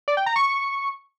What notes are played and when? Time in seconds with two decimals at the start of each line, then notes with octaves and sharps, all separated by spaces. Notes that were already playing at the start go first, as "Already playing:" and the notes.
0.08 D5
0.17 G5
0.26 A#5
0.36 C#6